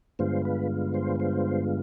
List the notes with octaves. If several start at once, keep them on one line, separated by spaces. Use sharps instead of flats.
G2 D3 G#3 B3 F4 C5
B4
C5
C5